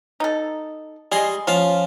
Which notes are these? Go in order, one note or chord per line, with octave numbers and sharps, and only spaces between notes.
D#4 A4
G3 G#3 G#4 D#5 C6
F3 C#4 F4 F5